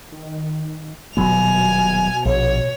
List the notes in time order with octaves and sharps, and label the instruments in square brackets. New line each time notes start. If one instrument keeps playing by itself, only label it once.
[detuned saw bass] D#3
[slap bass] D#1 F#3 B3 [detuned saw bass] B2 [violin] G#5 F6
[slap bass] A#1 [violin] C#5